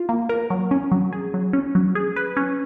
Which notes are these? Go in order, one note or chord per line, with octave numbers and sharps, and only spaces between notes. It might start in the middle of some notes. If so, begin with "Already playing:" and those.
Already playing: F4
A#3
A#4
F#3
C#4
F#3
G#4
F#3
C#4
F#3
G#4
B4
C#4